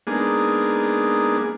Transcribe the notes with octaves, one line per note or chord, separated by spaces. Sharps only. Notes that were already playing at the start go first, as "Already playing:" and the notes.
G#3 A#3 B3 D4 D#4 G#4